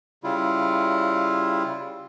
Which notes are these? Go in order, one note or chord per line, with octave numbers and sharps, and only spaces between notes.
C#3 G3 E4 F4